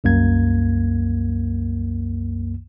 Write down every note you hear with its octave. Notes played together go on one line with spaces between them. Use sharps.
C2 F#2 A#3 G#6